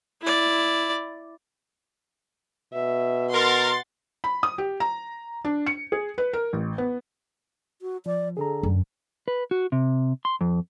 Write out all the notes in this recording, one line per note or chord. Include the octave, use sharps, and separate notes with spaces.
E4 D5
B2 E5
A#4 F#5 C6 A6
B5
D#6
G4
A#5
D4
C#7
G#4
B4
A#4
A1
B3
F#4
F3 D5
D3 G#4 A4 A#5
F#2
B4
F#4
C3
C6
F2